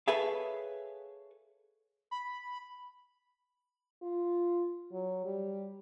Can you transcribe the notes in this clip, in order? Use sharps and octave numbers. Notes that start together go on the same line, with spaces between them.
G#4 A4 B4 C#5 E5 F5
B5
F4
F#3
G3